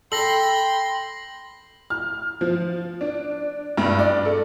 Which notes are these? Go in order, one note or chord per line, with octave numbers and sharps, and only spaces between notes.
A4 G5 B5 C6 A#6 F#7
F6
F3
D4
G2
D5
A4